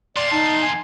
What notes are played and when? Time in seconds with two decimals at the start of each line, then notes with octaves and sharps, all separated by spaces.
0.16 E2 A#2 D5 C6
0.31 D#4 A5
0.63 G#5